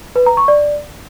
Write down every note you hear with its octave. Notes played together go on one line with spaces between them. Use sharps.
B4
A#5
C#6
D5